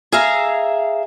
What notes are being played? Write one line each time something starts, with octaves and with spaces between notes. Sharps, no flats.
G#4 E5 F5 A#5